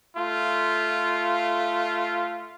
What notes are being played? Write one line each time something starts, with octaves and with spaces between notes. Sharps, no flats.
A3 F4